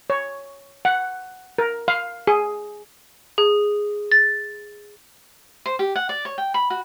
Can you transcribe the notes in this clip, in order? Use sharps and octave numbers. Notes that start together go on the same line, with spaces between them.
C#5
F#5
A#4
F5
G#4
G#4
A6
C5
G4
F#5
D5
C#5
G5
B5
F#4